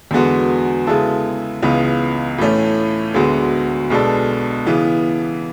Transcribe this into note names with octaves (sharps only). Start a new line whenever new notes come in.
E2 D3 G#3 B3 F#4
C#3 G#3 B3 E4 A4
C#2 C#3 E3 B3
A2 E3 A3 C#4
D2 D3 G#3 B3 F#4
B1 B2 G#3 D4 A4
C#3 E3 B3